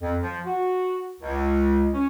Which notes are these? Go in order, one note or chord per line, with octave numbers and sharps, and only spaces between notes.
F2
F3
F#4
C#2
C#4